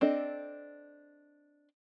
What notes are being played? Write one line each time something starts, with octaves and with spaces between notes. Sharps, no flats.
C4 D4 A4 D#5